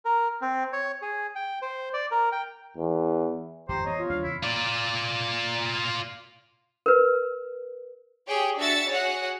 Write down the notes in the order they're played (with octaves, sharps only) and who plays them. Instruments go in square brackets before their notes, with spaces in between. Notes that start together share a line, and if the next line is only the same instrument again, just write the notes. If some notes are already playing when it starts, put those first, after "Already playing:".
[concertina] A#4
C4
C#5
G#4
G5
C5
D5
A#4
G5
[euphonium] E2
[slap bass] G#1 F2 A2 [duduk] G4 [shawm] C5 [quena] A#5
[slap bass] E3 B3 [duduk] C#5 [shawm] D#5
[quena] F4
[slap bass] D#2 G3 D4 [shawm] F5
[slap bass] E2 C#3 [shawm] E4
[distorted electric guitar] F4 D5
[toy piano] A#4 B4
[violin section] G4 G#4 C#5 G5
D4 F#4 E5 E6 A6 C#7
F#4 G#4 C#5 F#5